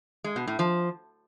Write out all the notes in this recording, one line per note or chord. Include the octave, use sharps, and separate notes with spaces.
G#3
B2
A2
F3